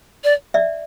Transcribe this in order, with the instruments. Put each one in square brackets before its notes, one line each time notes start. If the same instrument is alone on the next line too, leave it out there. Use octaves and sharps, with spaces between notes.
[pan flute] D5
[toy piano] D5 E5